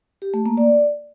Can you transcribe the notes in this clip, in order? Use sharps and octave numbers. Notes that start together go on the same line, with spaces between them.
G4
A3
A#3
D5